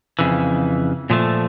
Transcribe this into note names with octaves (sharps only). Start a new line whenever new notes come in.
F2 C#3 E3
A#2 F3 A3